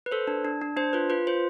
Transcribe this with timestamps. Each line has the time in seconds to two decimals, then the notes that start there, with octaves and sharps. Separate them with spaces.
0.06 B4
0.11 A4 C5
0.27 D4
0.45 D4
0.61 D4
0.77 D4 C5
0.93 F4 B4
1.10 F4 B4
1.27 F4 C5